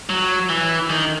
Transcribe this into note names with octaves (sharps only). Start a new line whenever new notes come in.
F#3
E3
D#3